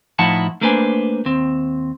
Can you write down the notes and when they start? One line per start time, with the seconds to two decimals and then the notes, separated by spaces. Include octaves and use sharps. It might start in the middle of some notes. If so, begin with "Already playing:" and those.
0.19 A2 F3 D#4 E4 F#5 A5
0.61 A3 A#3 D4 B4 C5 G#5
1.25 D#2 C4